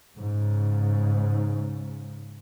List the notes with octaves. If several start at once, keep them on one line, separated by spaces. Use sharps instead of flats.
G#2 C#3